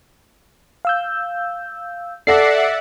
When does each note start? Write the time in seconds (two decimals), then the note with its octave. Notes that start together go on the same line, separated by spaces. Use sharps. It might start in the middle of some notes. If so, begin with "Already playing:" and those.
0.85 F5 E6 G6
2.27 A4 D5 E5 F#5 A#6 C7